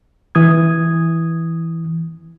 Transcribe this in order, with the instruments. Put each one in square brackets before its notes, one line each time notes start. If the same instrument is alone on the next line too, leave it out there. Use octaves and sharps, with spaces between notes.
[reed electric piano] E3 D#6 G#6